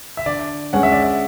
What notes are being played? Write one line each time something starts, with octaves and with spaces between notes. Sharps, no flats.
E5
D3 D5
G#3 C#4 F#5
E5
D5
E5